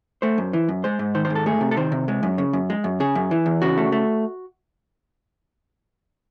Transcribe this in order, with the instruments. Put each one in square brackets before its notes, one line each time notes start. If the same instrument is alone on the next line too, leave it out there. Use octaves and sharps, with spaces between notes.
[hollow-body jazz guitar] A3 C5
F#2
E3
F#2
G#3 C5
G#2
D#3 C5
C5
G#2
A4
A3 G#4
C3
A4
D#3 C5
C3
G#3
F#2
C#3
F#2
G#3
F#2
C#3 G#4
F#2
E3
E2
C#3 F#4
A3
A3